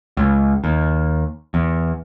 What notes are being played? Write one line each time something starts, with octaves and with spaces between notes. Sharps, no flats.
C#2
D#2
E2